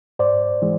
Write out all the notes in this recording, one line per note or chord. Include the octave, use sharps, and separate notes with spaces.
G#2 C5 D5
E3 G#3